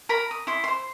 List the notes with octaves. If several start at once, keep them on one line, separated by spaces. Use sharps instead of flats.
A#4 A#5 B5
D#6
E4 C6
C5 C6